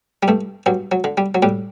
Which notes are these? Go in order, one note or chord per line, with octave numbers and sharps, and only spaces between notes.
G3
G2 A3
G2 F#3
F#3
D3
G3
F#3
A2 G3